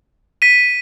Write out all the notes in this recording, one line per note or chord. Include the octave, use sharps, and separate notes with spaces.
B6 D#7